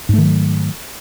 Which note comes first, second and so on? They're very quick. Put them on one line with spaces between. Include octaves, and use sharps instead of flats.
G#2 A3 D#3 F#3